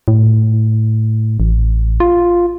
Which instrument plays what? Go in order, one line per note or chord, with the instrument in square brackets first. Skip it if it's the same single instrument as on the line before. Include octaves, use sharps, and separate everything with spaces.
[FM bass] A2
A1
F4